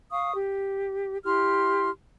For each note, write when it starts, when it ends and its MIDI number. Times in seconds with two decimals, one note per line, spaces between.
0.11 0.34 77
0.11 0.34 85
0.11 0.34 87
0.35 1.18 67
1.25 1.90 64
1.25 1.90 67
1.25 1.90 84
1.25 1.90 89